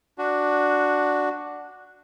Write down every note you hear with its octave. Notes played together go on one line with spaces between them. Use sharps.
D4 F#4